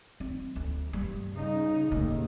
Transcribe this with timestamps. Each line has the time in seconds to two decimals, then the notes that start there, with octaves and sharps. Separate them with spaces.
0.20 C4
0.56 D2
0.93 G2 G3
1.33 C#3 D#4
1.91 D#2 A2 C#3 A3